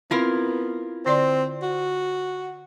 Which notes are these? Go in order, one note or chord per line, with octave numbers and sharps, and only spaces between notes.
B3 C4 E4 F4 A#4
D3 C4 D5 C6
F#4